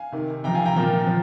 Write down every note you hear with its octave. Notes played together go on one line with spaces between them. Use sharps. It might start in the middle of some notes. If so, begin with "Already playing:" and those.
Already playing: F5 G#5
C3 D#3
C3 F3 G5 A#5
F5 G#5
G5 A#5
A#2 F3 G5 A#5
F3